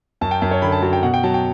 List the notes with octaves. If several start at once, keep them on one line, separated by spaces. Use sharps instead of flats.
F#2 A5
G5
F#2 A5
C#5
D3 B5
A5
F#3 A5
G5
B2 F#5
G5
F#3 A5
G5